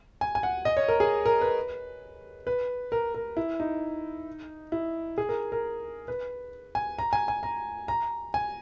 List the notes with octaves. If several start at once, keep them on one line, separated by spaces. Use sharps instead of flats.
G#5
G#5
F#5
D#5
C#5
A#4
G#4
A#4
B4
B4
A#4
A#4
E4
D#4
E4
G#4
A#4
A#4
B4
G#5
A#5
G#5
G#5
A#5
A#5
G#5